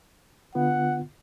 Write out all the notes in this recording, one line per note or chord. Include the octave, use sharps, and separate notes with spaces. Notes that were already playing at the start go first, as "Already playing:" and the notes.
D3 B3 F4 F#5